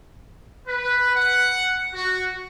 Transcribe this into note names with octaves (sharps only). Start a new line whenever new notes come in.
B4
F#5
F#4